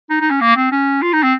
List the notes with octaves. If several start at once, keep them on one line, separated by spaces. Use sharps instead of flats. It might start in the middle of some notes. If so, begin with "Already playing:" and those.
D#4
D#4
C#4
A#3
C4
C#4
F4
D#4
C4